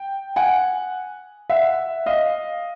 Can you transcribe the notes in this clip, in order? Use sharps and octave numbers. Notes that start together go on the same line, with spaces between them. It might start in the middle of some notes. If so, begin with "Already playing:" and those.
Already playing: G5
F#5 G#5
E5 F#5
D#5 F5